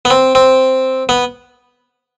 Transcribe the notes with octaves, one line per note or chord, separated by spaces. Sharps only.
B3
C4
C4
B3